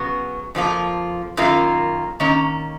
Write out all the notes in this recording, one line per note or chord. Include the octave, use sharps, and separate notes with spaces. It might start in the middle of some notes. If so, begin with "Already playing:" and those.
Already playing: C#3 F#3 B3 F#4
F2 F3 A#3 F4
F#2 D#3 A#3 F4
D#3 A#3 C#4